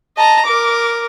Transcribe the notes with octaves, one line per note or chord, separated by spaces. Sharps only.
D#5 A5 A#5
A#4 D6